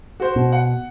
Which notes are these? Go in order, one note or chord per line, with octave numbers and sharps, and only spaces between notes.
F#4 C5
B2
F#5